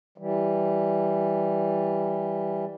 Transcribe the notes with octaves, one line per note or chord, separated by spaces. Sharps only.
E3 G3